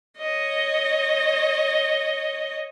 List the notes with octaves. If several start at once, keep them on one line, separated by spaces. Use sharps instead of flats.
C#5 D#5